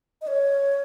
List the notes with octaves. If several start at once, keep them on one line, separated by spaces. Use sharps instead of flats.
D#5
C#5